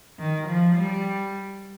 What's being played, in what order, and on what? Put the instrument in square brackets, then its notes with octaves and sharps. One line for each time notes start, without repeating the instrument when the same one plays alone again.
[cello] D#3
F3
G3